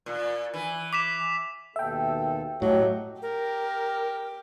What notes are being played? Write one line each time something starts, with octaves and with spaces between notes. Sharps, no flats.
A#2
E3
D6 B6 E7
D#2 B2 A4 E5 G5
A2 F#3 G4 A4 D#5
G4 A#4